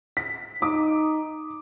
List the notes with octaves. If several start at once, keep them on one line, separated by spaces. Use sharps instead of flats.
B6
D#4 D6 D#6